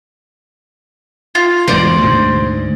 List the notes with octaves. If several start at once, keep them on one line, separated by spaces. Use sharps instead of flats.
F4
E1 G#2 B2 C5 D5
D2 G#2